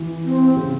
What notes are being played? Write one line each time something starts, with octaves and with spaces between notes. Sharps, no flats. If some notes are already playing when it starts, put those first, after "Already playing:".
Already playing: E3
C4
C#3